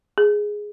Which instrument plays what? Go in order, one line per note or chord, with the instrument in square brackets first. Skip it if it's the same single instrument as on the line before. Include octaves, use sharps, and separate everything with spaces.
[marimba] G#4